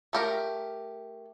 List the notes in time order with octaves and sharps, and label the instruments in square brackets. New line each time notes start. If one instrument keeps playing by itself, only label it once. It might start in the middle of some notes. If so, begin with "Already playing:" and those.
[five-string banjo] A3 G4 A#4